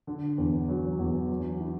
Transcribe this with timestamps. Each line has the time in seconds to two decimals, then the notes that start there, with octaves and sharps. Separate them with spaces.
0.07 D3
0.38 E2
0.68 F#3
0.99 E2
1.30 F#3
1.60 E4